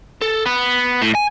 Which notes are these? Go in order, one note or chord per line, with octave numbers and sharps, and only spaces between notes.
A4
B3
A2
G#5